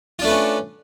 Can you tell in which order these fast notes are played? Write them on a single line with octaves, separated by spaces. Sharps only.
F4 D4 A3 B4 C#4